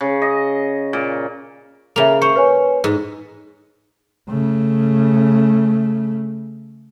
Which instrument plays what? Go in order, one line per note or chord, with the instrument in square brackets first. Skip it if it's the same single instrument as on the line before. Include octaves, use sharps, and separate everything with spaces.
[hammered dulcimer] C#3
D#5
A#2
[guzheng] C#3 A#3 [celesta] E5 F7
[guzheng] C5 [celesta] C#6 C#7
[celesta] B4 C#5 G#5
[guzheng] G#2
[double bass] C#3 A3